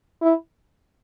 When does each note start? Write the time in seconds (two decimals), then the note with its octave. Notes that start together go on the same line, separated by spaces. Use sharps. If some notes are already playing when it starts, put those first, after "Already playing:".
0.22 E4